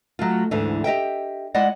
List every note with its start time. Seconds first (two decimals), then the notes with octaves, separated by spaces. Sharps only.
0.19 F#3 A3 F4
0.51 D2 G#2 D3 E3
0.84 G4 D#5 E5 G5
1.54 G#3 E4 D5 D#5 F#5